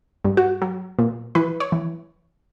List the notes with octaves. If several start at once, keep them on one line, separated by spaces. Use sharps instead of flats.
G2
F#4
F#3
A#2
E3 B4
C#5
E3